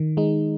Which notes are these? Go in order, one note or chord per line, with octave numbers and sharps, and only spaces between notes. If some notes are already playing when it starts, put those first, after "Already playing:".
Already playing: D#3
G#3 D#4